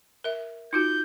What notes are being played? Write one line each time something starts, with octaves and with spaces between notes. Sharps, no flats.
A#4 E5
D#4 F4 F#4 G6